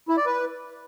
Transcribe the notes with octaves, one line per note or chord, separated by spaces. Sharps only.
E4
D5
B4